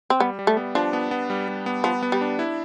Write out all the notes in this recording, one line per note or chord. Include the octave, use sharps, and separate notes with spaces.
C4
G3 B3
G3
A3
B3
F3 D4
B3
B3
G3
G3
B3
F3 B3
B3
G3
D4
E4